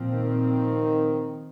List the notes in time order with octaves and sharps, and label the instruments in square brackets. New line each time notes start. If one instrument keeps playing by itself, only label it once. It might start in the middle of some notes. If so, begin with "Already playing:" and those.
Already playing: [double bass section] A#2 F3 C4
[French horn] D#3